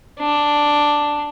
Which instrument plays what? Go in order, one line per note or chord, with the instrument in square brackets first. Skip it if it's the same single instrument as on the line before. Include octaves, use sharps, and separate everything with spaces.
[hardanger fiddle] D4